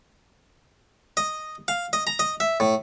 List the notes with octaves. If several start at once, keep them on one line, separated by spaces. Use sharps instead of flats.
D#5
F5
D#5
A#5
D#5
E5
A2